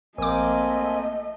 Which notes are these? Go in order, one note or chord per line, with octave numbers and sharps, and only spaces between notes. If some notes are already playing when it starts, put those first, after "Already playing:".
A#1 A3 A#3 C4 D#5 G#5 D6